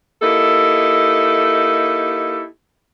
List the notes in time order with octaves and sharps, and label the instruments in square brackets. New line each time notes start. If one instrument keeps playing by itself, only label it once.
[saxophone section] A#3 D#4 E4 G4 A4